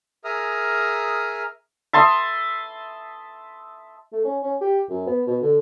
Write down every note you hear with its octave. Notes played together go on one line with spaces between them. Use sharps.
G#4 A#4 E5 A#5 D#6 F6
E5 A5 C6 D#6
A3
C#4
C#4
G4
F#2
B3
B2
D3